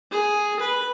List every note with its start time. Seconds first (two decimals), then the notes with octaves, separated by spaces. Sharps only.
0.12 G#4
0.60 B4